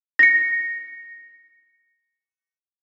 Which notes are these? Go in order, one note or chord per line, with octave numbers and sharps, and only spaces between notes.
A#6 C#7